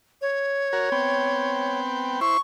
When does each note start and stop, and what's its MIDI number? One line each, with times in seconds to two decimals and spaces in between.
0.21 1.80 73
0.73 0.90 66
0.73 0.90 70
0.92 2.20 59
0.92 2.20 60
0.92 2.20 79
2.21 2.37 64
2.21 2.37 72
2.21 2.39 85